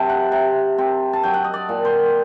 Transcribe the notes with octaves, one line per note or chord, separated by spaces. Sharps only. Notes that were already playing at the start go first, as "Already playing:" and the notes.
Already playing: C3 F#3 A5
F#5
C3
C4
A5
F#3 G5
F#5
D#5
D5
A#2
C5